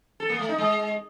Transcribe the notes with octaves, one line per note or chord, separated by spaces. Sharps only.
A4
A#3
A3
D#4
G#3